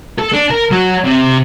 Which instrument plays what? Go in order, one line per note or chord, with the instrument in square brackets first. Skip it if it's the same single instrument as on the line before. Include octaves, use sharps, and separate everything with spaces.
[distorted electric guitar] A4
D4
A#4
F#3
C3